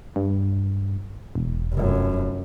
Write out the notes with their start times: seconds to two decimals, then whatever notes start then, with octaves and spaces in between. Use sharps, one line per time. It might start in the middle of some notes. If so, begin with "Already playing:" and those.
0.16 G2
1.35 E1
1.72 F1 F#2